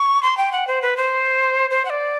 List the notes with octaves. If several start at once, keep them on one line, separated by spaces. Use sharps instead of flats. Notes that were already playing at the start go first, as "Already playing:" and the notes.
Already playing: C#6
C6
G5
F#5
C5
B4
C5
C5
F#5
D5